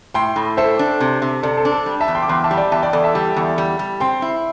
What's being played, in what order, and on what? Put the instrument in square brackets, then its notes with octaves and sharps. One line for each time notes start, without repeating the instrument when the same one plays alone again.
[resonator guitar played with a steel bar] A2 [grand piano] G5 C6
[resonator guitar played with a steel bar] A2
[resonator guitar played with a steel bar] A4 [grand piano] C5 E5
[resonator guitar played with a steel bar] D4
C3
C3
[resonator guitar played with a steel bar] C3 [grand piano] A4 D5
[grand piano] A4
[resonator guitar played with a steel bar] D4
[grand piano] A4
[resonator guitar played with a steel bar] G3
[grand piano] E5 A5
[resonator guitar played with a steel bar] E2
[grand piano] G5 C6
D6
[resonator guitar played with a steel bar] E2 [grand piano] G5 C6
[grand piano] E5 A5
[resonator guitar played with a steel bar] G3
[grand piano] D5 G5
[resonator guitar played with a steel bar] E2 [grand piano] E5 A5
[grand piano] D5 G5
[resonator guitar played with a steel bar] E2 [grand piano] A4 D5
[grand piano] E5 A5
[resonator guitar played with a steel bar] G3
E2
G3
G3
[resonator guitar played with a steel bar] C4 [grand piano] G5 C6
[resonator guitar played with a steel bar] E4